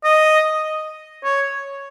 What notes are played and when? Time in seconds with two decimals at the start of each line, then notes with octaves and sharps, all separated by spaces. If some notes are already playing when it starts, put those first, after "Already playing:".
0.04 D#5
1.24 C#5